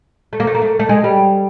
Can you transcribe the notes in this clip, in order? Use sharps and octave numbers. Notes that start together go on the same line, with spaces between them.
A3
A#3
A3
A#3
A3
A3
G#3
G3